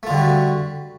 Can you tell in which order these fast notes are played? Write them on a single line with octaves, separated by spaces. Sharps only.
A3 F4 D3 G3 F#4